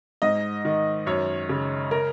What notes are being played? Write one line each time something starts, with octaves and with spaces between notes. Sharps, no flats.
G#2 D#5
D#3
F#2 C#5
C#3
A#4